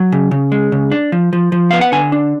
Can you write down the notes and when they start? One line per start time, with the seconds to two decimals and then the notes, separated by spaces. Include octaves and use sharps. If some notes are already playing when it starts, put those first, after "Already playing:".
Already playing: F#3
0.12 C#3
0.31 C#3
0.52 G#3
0.72 C#3
0.92 D4
1.12 F3
1.33 F3
1.52 F3
1.71 B3 F5
1.81 F#5
1.92 D3 G#5
2.12 D4